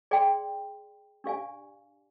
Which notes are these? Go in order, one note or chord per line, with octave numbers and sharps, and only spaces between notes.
G#4 D5 G5 C6
D4 G4 D5 F5 G#5